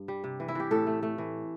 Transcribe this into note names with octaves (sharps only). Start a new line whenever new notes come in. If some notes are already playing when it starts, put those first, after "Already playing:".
Already playing: G2
G3
C3
E3
E4
E3 G4
A2 A4
A3
A3
E3